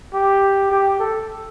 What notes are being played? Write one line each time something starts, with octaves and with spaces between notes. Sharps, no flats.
G4
G4
A4